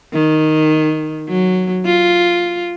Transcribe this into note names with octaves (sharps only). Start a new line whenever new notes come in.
D#3
F#3
F4